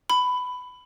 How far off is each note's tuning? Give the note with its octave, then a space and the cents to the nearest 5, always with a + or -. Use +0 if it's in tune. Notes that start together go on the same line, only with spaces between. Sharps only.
B5 +15